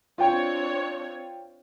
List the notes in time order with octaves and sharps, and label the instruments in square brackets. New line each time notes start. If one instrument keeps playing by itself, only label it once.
[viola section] C4 D4 C#5 [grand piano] F4 G5